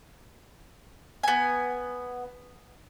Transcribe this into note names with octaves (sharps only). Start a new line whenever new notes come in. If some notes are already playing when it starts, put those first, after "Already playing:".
B3 G#5